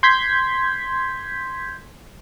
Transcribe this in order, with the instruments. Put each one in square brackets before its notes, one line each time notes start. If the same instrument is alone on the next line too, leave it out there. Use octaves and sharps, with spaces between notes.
[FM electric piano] C6 G6 G#6 B6